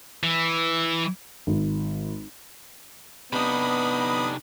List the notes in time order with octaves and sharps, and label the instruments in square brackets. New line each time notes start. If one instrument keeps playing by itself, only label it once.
[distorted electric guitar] E3
[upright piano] G#1
[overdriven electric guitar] C3 D#4 [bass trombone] B3 [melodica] D4 [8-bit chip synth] B5 D#6